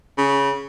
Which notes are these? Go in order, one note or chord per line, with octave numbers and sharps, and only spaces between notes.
C#3